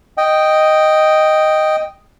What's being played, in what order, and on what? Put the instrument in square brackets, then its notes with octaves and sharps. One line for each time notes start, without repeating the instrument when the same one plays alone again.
[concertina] D#5 G5